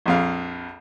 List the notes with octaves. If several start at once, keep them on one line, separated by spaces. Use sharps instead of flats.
A#1 F2 F5